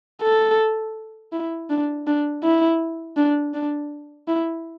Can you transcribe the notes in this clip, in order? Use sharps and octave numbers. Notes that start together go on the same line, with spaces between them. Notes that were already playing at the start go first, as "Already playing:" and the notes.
A4
E4
D4
D4
E4
D4
D4
E4